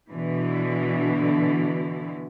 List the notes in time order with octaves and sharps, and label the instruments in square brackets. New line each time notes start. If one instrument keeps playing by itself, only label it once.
[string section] B2 D3 E3